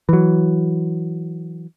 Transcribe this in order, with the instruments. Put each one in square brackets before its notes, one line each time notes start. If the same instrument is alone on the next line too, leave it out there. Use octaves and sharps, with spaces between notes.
[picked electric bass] E3 F#3